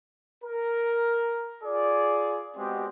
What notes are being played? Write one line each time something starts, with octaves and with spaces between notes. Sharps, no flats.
A#4
F4 G#4 D5
G#3 B3 C4 F#4 G4 D#5